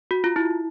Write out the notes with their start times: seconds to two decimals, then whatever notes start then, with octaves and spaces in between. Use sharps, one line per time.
0.11 F#4
0.24 F4
0.36 E4